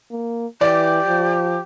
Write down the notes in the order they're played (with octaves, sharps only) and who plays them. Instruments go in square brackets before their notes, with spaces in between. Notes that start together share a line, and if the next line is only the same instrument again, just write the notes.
[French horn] A#3
[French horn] E3 [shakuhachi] G4 [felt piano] D5
[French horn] F3